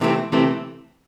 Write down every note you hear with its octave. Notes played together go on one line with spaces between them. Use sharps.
C3 E3 A3 C4
C3 E3 A3 C4